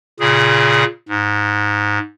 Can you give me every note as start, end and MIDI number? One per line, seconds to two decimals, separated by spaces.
0.20 0.84 46
0.20 0.84 49
0.20 0.84 68
1.09 1.99 44